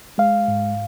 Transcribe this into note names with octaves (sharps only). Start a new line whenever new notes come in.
G#3 F5
G#2